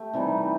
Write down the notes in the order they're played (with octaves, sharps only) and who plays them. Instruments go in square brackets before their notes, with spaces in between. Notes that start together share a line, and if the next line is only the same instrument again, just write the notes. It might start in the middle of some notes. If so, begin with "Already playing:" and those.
Already playing: [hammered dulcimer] A3 G4
C3 E3 G3 D#4